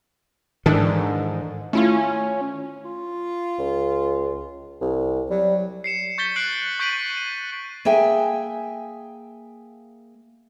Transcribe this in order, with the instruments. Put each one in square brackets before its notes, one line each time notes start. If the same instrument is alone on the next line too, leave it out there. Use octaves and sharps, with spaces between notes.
[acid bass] G#2 [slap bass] D#3 [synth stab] E3 D4 A4
[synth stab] A3 E4 F4 [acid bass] C#4
[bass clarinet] F4
[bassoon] C#2
C2
[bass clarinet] F#3 [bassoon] G3
[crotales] C7 C#7 E7
C#6 G6 A6 B6 G7
F#6 C7 D7 F#7
C#6 G6 B6 D7 D#7 F#7
D#7
[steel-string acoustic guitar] A#3 G#4 E5 G5 G#5